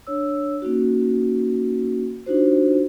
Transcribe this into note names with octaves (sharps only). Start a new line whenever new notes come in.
D4 C#5 E6
A#3 C#4 D#4 F#4
D4 D#4 F4 F#4 C5